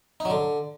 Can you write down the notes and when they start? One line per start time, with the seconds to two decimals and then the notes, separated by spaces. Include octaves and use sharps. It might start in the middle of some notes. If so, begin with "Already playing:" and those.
0.20 D#4
0.25 F#3
0.30 D3